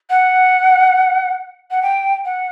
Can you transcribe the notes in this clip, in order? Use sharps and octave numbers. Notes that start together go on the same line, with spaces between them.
F#5
F#5
G5
F#5